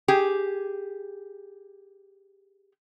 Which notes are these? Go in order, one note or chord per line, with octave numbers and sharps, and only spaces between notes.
G4 G#4